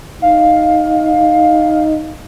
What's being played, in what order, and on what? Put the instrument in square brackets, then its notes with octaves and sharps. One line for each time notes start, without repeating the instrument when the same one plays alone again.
[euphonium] D#4 [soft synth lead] F5